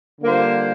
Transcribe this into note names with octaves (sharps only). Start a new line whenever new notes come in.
D3 G3 A#3 F4 C5